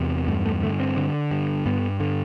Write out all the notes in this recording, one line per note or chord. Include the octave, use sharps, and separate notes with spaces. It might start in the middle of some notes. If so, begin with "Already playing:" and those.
Already playing: E2 C3
G2 A3
A3
D3 A3
C4
D3
G2
G2 B3
D3